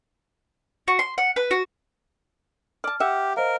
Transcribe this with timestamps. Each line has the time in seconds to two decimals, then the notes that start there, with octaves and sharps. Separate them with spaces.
0.88 F#4
0.99 C6
1.18 F#5
1.36 B4
1.51 F#4
2.84 D5 A5 F6
3.00 G4 E5 F#5
3.37 A#4 C5 D#5 F5